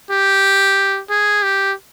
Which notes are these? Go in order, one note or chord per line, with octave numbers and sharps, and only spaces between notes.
G4
G#4
G4